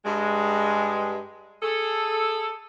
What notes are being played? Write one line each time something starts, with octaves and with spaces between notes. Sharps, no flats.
G2 G#3
G#4 A4